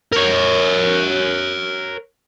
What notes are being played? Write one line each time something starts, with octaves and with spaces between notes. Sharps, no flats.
A#4 C#5